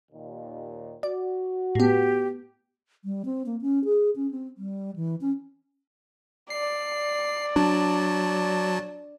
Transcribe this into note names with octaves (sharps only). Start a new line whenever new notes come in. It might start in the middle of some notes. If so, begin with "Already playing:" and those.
D#2 A#2
F#4 D5
A2 B3 G4
G3
C4
A#3
C#4
G#4
C#4
C4
G3
E3
C#4
D5 C7
F#3 D4 A5